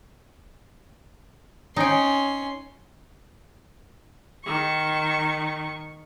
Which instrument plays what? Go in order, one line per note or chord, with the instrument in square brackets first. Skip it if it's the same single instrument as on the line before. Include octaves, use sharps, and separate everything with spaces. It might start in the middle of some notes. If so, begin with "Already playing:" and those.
[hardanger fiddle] C#4 C6 [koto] D#4 G5
[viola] D#3 C#6